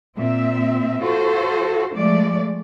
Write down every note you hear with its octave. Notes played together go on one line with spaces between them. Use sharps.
A#2 C4 E5
F4 F#4 A4 C5
F3 G#3 A3 D5